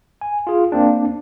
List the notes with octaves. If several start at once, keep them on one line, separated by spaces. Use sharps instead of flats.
G#5
F4 G#4
A#3 C4 D4